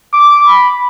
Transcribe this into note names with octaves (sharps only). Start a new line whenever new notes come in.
D6
B5